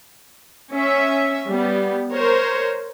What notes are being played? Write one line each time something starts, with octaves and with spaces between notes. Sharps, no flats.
C#4 E5
G3 B3
A#4 C5 C#5